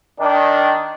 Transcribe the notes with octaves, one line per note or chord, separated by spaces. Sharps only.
D#3 D4